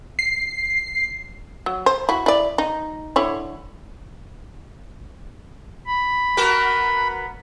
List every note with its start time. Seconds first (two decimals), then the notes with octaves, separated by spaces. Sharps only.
0.19 C7
1.66 F#3
1.86 C5
2.09 E4 F#4
2.26 E4 D5
2.58 D#4
3.16 D3 E4 C#5
5.87 B5
6.37 B3 F#4 A#4